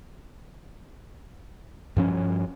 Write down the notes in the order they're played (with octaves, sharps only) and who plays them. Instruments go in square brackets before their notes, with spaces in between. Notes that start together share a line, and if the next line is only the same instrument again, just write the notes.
[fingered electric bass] G2 F3 C#4